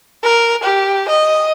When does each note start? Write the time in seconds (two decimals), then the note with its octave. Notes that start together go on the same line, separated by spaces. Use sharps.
0.24 A#4
0.63 G4
1.09 D#5